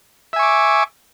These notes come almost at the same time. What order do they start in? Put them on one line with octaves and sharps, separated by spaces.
E5 G#5 C#6 D6